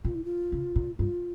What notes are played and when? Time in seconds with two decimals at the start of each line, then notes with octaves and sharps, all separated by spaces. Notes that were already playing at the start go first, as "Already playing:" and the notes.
0.05 A#2 F4
0.15 E4
0.24 F4
0.52 C#3
0.76 A#2
0.99 G2 F4